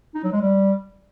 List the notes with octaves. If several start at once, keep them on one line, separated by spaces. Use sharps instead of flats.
D#4
F#3
G#3
G3